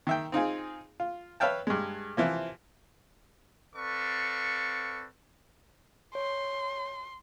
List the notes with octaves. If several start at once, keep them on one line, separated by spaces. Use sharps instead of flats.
D#3 E5 G5
C4 D#4 F4 G#4
F4
B4 C#5 E5 F5 G5 A5
G2 G#3
C3 E3 F3 A#3
C4 A4 B4 D5 F5 C#6
C#5 C6